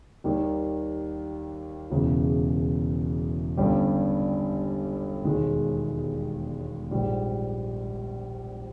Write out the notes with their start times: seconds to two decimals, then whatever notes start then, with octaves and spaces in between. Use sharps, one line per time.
0.24 D#2 D#3 G3 A#3
1.90 E1 E2 C#3
3.57 G1 G2 G3 C#4 G4
5.24 E1 D#2 D#3 G#3
6.91 A#1 G#2 G3